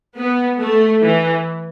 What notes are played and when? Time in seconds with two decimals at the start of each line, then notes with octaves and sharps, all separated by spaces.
0.16 B3
0.59 A3
1.02 E3